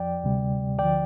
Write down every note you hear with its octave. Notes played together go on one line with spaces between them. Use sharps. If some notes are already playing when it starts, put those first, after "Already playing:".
Already playing: F2 F3 D5 G5
D2 C3 G3
D2 D3 F3 D5 G5